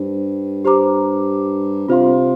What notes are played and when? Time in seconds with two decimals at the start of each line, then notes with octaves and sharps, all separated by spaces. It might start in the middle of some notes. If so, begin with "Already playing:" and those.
Already playing: G2 C5
0.65 G4 C5 A#5 D6
1.88 C3 F4 C5 F5 C6